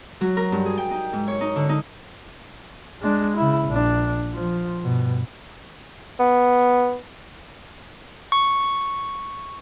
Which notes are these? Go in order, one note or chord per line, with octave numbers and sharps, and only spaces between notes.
F#3
A#4
G2
G#4
G5
D#4
G#2
C#5
D#4
D3
D#4
G#3 D4
C#3 E4
A#1 D4
F3
G2 B2
B3
C#6